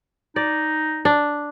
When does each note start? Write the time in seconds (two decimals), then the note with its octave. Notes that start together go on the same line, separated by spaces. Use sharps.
0.36 D#4 D5
1.05 D4